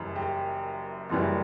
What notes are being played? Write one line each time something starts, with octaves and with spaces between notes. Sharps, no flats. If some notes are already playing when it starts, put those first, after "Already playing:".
Already playing: F#1 F#2 E3 G3
G4
F#1 F#2 E3 G3